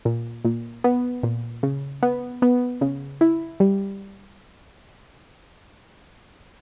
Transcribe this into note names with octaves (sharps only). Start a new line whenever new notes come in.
A#2
A#2
B3
A#2
C#3
B3
B3
C#3
E4
G3